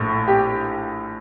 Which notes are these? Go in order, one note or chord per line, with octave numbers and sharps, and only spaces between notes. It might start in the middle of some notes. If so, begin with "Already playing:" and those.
Already playing: A#1 A2
G4